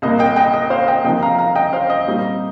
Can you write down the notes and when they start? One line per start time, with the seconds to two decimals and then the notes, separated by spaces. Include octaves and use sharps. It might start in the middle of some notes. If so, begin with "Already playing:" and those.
0.02 C2 A#2 A#3 D#5
0.19 D#5 G5
0.36 D#5 G5
0.54 D#5
0.70 C5 F5
0.88 D#5 G5
1.04 C3 F3 A#3 D#4 D#5 G5
1.22 F5 A#5
1.38 F5 A#5
1.55 D#5 G5
1.73 C5 F5
1.90 D#5
2.07 A#2 G3 C4 D#4